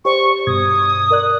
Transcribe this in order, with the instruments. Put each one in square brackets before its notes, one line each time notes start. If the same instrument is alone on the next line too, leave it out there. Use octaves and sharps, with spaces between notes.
[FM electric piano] G4 C5 D5 [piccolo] C#6
[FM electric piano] G2 B2 G#6 [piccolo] D#6
[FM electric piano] A#4 D5 F#6